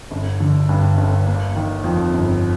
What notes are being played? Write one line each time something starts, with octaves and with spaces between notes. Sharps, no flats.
G1
D3
G2
G1
A#3
D#3
F2
G1